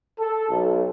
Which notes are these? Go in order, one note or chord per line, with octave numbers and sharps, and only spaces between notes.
A4
B1